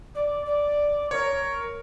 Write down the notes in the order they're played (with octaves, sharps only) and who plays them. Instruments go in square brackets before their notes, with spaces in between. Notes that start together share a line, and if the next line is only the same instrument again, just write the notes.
[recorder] D5
D5
[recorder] A#4 [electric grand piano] C#5